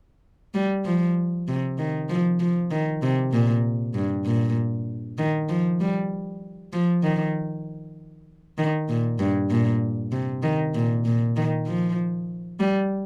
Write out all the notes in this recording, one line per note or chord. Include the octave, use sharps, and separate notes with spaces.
G3
F3
C3
D#3
F3
F3
D#3
C3
A#2
G2
A#2
D#3
F3
G3
F3
D#3
D#3
A#2
G2
A#2
C3
D#3
A#2
A#2
D#3
F3
G3